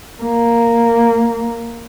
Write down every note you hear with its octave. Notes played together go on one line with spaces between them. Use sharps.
A#3